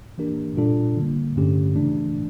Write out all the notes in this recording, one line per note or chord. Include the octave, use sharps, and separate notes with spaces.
E3 A#3 D4 G4 A#4
A#2 G3 D4 F4 A4
D3 G3 A#3
G2 D3 A3 C#4 G4
C#3 E3 A3 D4